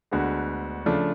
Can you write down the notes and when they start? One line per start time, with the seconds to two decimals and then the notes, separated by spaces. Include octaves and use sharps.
0.11 D2 D3 G#3 B3 F#4
0.86 C#3 F3 A3 D4